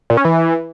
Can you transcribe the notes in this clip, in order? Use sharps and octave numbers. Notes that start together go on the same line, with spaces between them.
A#2
C#4
E3